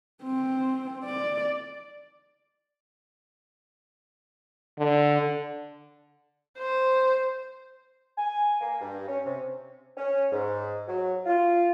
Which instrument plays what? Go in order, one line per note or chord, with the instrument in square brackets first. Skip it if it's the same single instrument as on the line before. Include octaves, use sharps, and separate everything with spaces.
[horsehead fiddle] C4
D5
[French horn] D3
[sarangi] C5
[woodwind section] G#5
A#3
G2
C#4
C3
C#4
G#2
F#3
F4